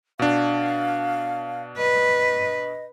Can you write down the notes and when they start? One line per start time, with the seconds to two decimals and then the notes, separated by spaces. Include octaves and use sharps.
0.19 B2 D4 F5
1.78 B4 D#5